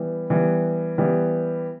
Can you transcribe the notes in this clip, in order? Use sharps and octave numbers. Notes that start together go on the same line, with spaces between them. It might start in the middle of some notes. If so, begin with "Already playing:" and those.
Already playing: E3 G3 B3
E3 G3 B3
E3 G3 B3